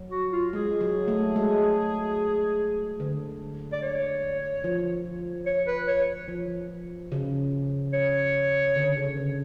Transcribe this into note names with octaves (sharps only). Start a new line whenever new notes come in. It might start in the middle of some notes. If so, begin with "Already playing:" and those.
Already playing: F#3
F#4
F4
G#3 G#4
F#3
A3
G#3
D3
D5
C#5
F3
C#5
B4
C#5
F3
C#3
C#5
D3
C#3
D3